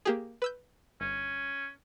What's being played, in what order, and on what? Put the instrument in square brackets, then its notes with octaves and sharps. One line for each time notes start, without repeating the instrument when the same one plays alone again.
[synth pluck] A#3 G4 G#4
B4 E6 G6
[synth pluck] G1 [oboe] C#4